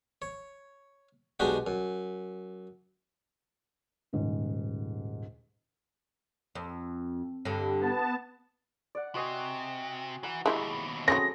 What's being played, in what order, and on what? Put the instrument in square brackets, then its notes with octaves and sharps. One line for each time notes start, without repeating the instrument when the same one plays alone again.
[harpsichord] C#5
B1 G#3 D4 D#4 F#4 G4
F#2
[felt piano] D#1 G#2 C#3
[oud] F2
G2 D3
[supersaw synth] B3 A5
[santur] D5 F#5
[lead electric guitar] C3 [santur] F#4 D#5 G#5
[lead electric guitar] E3 [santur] F#5 A#5
[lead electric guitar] D#2 B2 [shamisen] G#3 E4 G4 [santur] E5 A#5 B5
[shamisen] F#3 C4 C#4 [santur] A3 G#4 D#6 [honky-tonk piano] A#6